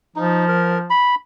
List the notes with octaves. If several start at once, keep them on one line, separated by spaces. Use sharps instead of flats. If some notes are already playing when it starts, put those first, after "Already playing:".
F3 D#4
A#4
B5